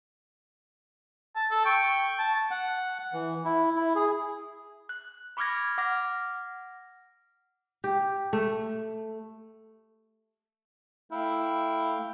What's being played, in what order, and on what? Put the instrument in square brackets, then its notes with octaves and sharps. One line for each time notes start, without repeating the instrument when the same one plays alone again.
[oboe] A5
A4
[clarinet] G5 [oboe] C#6
[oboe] A5
[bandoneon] F#5
E3
E4
E4
G#4
[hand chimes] F#6
B5 C#6 D6 F6 G#6 A#6
F#5 D6 F6 A#6
[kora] G4
A3
[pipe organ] A3 F5 G5 [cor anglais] E4